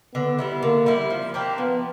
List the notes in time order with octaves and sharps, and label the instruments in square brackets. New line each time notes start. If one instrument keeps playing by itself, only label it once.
[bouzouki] D3 [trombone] B3
[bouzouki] G3 B3 E4
[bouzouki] D3 [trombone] A#3
[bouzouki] G3 B3 E4
F3
A#3 D4 G4
[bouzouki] F3 [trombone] B3